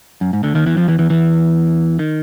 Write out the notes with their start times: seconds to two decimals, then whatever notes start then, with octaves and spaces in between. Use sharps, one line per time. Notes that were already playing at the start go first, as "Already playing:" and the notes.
0.21 F#2
0.33 G#2
0.43 D2 D3
0.55 D#2 D#3
0.66 E2 E3
0.77 F2 F3
0.88 E2 E3
0.99 E2 E3
1.10 E2 E3
1.99 D#3